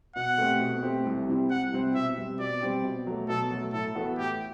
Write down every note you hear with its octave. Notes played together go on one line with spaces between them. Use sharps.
B2 F#5
A3 C4 G4
B2
A3 C4 G4
C2
C3 G3 C4 E4
C2 F#5
C3 G3 C4 E4
B2 E5
G3 C4 G4
B2 D5
G3 C4 G4
B2
F#3 A3
B2 A4
F#3 A3
A2 A4
E3 B3 F#4 A4
A2 G4